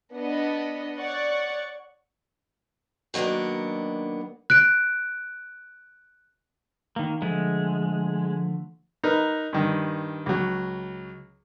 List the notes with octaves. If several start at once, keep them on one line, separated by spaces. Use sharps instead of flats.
B3 D4 D#5
C#5 D5 F#5 C#6
D#3 F#3 A#3 B3 D4
F#6 D7
D#3 A#3
D3 F3 G#3 A3
D#4 A#4 B4
G2 D#3
C#2 F#3